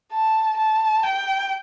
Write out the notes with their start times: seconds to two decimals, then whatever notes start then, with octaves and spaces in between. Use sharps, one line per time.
0.13 A5
0.58 A5
1.04 G5